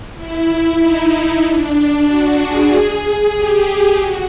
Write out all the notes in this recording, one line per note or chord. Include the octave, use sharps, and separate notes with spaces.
E4
D#4
D#4
D4
F#4
G#4
G4
F#4